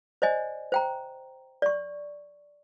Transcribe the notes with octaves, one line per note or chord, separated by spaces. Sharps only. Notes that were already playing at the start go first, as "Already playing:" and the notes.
C5 D5 D#5 G#5
C5 G5 A#5
D5 C#6